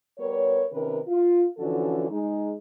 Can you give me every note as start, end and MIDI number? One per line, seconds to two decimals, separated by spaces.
0.19 0.65 55
0.19 0.65 59
0.19 0.65 70
0.19 0.65 73
0.72 0.98 48
0.72 0.98 51
0.72 0.98 61
0.72 0.98 70
0.72 0.98 71
1.08 1.45 65
1.58 2.09 50
1.58 2.09 52
1.58 2.09 53
1.58 2.09 61
1.58 2.09 66
1.58 2.09 69
2.09 2.53 56
2.09 2.53 63